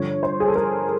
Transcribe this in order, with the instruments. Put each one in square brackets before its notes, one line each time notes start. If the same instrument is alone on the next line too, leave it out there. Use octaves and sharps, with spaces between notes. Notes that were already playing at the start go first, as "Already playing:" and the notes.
Already playing: [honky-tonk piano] G2 D3 F3 C#5
C5
G#4
A4
A#4